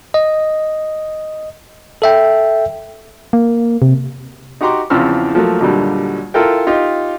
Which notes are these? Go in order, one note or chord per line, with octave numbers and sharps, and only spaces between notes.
D#5
A4 E5 G5
A#3
C3
D#4 F#4 G4 A#5 C6 D6
E2 C#3 F3 C4 E6 F6
F3 F#3 A3 A#3
D#2 A#2 D3 F#3 G3
E4 F4 A4 A#4 G5
D#4 F4 G4